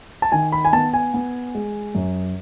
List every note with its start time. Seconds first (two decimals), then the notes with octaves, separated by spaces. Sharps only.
0.22 A5
0.32 D#3 G#5
0.52 B5
0.65 G#5
0.73 B3 A5
0.94 G#5
1.14 B3
1.55 G#3
1.95 F#2